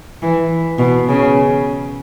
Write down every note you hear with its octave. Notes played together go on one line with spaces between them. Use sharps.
E3
B2
C#3